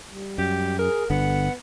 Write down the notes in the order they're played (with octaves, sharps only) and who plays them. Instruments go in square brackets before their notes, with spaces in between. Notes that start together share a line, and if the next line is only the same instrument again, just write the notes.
[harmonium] G3
[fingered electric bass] F#2 [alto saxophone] G4
[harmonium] G#4 [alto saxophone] A#4
[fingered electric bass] G1 D3 [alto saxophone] B3 [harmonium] F#5